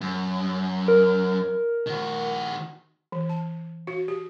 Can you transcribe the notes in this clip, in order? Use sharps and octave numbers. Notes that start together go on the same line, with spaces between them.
F#2
A#4
D#3 F#4
E3
A5
F#4
G4